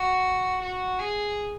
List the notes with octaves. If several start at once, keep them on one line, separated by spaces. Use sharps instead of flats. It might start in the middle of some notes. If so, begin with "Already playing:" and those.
Already playing: F#4
F#4
G#4